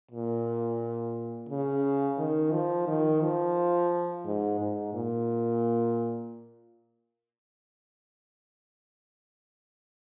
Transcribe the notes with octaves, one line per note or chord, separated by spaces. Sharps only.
A#2
C#3
D#3
F3
D#3
F3
G#2
G#2
A#2